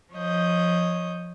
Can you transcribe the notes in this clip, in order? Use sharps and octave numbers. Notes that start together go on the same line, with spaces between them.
F3 C#5 D#5 G6